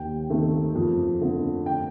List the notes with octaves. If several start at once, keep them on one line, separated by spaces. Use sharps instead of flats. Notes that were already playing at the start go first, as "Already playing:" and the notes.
Already playing: D#2 G5
D#3 A3 C4
F2
D3 A3 C4
G5